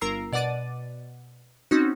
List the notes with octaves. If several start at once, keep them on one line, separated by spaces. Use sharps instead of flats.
G1 A#4 A#5 E6 C7
B2 D5 F#5 D6 A6 D#7
C4 C#4 D#4 F#4